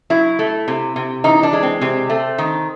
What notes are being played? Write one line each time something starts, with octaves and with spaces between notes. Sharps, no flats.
F#3 E4
A3
C3
C3
E3 D#4
D4
G#3
C4
C3 C4
A3
D#3